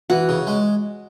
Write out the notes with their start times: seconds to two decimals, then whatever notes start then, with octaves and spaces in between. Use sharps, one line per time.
0.10 E3 F#4
0.29 C#3
0.47 G#3